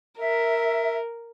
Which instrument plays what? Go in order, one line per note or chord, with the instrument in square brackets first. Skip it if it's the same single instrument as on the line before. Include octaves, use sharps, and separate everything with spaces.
[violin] A#4 [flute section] E5